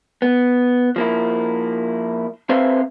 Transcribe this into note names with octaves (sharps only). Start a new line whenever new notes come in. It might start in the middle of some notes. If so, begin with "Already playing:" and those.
B3
F3 A#3 E4
C4 A4 B4 C5 E5 F5